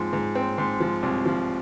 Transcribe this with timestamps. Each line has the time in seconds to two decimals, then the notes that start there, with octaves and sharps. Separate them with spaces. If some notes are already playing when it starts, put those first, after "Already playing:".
Already playing: G#2 F3 C4
0.13 G#2
0.35 C4
0.58 G#2
0.80 F3
1.03 C2
1.26 F3